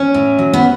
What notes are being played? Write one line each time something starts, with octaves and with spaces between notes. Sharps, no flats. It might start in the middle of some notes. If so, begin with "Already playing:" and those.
Already playing: C#4
A2
F#3
B3